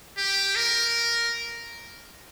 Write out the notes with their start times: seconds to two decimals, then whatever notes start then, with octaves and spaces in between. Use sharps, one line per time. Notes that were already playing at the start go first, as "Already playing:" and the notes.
0.18 G4
0.56 A#4